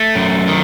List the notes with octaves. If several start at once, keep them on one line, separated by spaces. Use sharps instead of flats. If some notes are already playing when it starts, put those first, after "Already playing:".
Already playing: A3
F#2
D#3